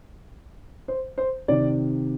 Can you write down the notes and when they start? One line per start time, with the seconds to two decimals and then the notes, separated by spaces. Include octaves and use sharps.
0.88 C5
1.18 C5
1.48 C3 D#3 D5